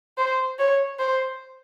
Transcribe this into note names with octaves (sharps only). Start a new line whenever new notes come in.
C5
C#5
C5